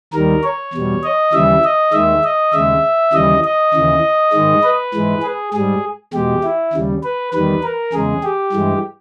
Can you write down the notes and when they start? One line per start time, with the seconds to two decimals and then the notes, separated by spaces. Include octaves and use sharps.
0.13 D#2 D#3 G3 A#4
0.44 C#5
0.73 E2 B2 G3
1.03 D#5
1.33 D#2 C#3 E3 G3 E5
1.64 D#5
1.93 D#2 D#3 G#3 E5
2.24 D#5
2.53 D#2 C#3 G#3 E5
3.13 D#2 C#3 E3 G3 D#5
3.44 D#5
3.74 D#2 C#3 E3
4.33 G#2 D#3 G#3
4.63 B4
4.94 G#2 E3 G#3
5.23 G#4
5.53 G#2 G3 G#4
6.13 E2 B2 G#3 G4
6.43 E4
6.73 D#2 C#3 G3
7.03 B4
7.33 E2 D#3 G3 B4
7.63 A#4
7.93 E2 C#3 G#3 G#4
8.23 G4
8.52 G2 E3 G#3